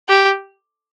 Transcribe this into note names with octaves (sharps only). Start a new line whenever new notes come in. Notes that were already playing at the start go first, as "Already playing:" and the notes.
G4